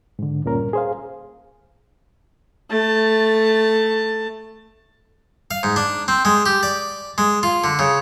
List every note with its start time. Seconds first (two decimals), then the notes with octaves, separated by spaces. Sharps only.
0.19 G#2 D3
0.44 D2 G2 A#2 C#4 A#4
0.73 G#4 C5 F5
2.70 A3 A5
5.51 F5
5.63 G#2
5.76 D4
6.08 C4
6.25 G#3
6.46 G4
6.63 D5
7.18 G#3
7.43 F4
7.64 D3
7.79 C#3